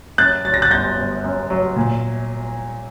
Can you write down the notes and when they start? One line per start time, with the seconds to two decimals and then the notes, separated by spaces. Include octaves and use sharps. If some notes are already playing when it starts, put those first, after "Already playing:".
0.18 F#2 F#6 A6
0.44 F#3 A6
0.54 A#6
0.62 F#6 A6
0.71 G1 G6 A#6
0.97 G1
1.24 F#2
1.50 F#3
1.76 A#2